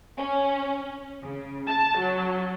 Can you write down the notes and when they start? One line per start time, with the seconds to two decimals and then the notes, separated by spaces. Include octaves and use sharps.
0.17 C#4
1.24 C#3
1.67 A5
1.99 F#3